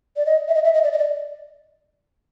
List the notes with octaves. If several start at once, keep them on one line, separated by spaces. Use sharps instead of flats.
D5
D#5
E5
D#5
E5
D#5
D5
D#5
D5